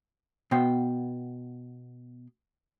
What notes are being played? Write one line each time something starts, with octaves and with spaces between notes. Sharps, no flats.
B2 B3 G5 C6